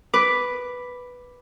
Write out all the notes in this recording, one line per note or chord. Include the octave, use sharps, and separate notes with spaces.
B4 D6